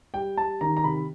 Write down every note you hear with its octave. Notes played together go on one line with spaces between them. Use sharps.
G3 G5
G3 A5
D#3 A#5
A#5
C3 B5